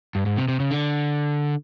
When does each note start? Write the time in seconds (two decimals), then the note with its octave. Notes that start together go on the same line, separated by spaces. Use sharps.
0.15 G2
0.26 G#2
0.37 C3
0.48 C3
0.60 C#3
0.71 D3